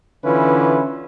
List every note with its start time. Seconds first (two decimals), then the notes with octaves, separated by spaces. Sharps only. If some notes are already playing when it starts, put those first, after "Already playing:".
0.24 D3 E3 C#4 E4 F4 B4